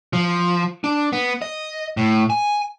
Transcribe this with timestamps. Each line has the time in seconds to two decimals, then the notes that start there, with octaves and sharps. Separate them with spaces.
0.13 F3
0.84 D4
1.13 B3
1.42 D#5
1.97 A2
2.30 G#5